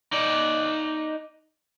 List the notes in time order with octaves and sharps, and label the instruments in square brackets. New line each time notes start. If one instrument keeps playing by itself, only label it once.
[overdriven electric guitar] D#4 D5